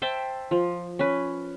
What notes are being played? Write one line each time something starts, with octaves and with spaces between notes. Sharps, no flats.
C5 E5 G5 A5
F3
C#4 B4